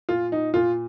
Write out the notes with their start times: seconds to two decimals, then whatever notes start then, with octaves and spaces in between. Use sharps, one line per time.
0.09 A#2 F4
0.32 D#4
0.54 A#2 F4